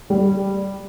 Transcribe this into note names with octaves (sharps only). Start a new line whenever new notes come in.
G3